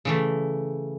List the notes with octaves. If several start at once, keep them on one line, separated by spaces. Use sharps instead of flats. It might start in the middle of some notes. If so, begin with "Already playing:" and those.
C#3 E3 A3